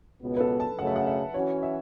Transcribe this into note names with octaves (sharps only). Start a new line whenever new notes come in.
C#2 B2 B3
B4
A4
A5
F#2 C#3 A3 F#5
E5
F#5
E5
E3 C#4 F#4 C#5
E5